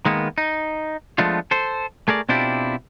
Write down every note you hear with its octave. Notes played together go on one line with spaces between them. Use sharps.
D#3 G#3 A#3 B3
D#4
F3 G#3 A3 B3 D4 F4
A4 C5
A3 G#4 A#4 D5
B2 C4 D4 E4 F4 G4